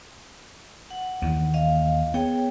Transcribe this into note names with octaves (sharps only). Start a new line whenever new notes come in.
F#5
D#2 D#3 E3
D#5 F5
B3 G#4 C#5 G5